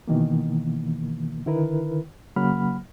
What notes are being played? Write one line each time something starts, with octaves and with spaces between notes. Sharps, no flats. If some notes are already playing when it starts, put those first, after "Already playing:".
B2 D#3 E3 A#3
D3 D#3 E4 A#4 B4
C#3 F#3 A#3 F#5 B5 F6